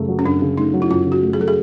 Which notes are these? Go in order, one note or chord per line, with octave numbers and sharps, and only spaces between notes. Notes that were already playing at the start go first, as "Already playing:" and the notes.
Already playing: F#2 C#3 A3
F#3
C#4
F#2 D4
C#3
A3 D#4
F#3
E4
F#2 F4
C#3
F#4
A3
G#4
F#3 A4
G#4